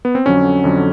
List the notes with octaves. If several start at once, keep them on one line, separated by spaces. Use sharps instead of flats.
B3
C4
F2 D3 F#3 C#4
F2 D3 F#3